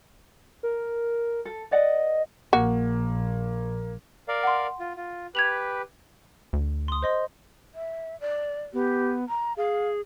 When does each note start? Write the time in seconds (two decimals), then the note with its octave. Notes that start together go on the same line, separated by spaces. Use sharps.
0.63 A#4
1.45 A4
1.71 B4 D5 D#5 F#5
2.53 A#1 A#3 F#4
4.28 A#4 D5 F5
4.43 F#5 C6
4.80 F4
4.97 F4
5.35 G4 B4 G#6 F7 F#7
6.53 D2
6.88 C6 D#6
7.02 C5 D#5 C6
7.75 E5
8.21 D5
8.74 B3 G4
9.29 A#5
9.57 G#4 F5